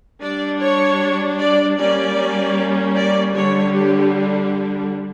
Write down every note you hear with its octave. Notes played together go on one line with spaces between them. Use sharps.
G3 D4 D5
C#5
D5
G3 A#3 C#4 D5
D5
D3 G3 D4 C#5
G4